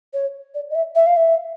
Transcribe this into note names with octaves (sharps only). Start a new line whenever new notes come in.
C#5
D5
D#5
E5
E5
F5
E5